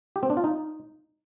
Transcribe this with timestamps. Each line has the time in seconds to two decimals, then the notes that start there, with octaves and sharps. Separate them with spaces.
0.16 G4
0.23 C4
0.30 D4
0.37 F4
0.44 D#4